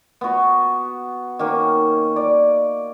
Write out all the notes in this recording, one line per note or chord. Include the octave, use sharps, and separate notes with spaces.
B3 F#4
D#3 A#3 C#4
D5